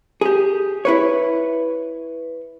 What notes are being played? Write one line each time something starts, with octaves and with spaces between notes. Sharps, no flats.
G4 G#4
E4 B4 C#5